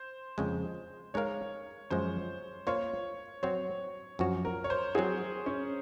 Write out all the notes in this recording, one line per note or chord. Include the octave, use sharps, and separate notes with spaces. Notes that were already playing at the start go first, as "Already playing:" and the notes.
Already playing: C5
F2 C#3 G#3
G#3 D#4 A#4 C#5 F5
F#2 F3 G#3 C5
A#3 F4 C5 C#5 F5
F#3 C4 F#4 C5 C#5
F#2 F3 C4 F#4 C#5
A#4
C#5
C5
F#3 C4 F#4 G#4
C#4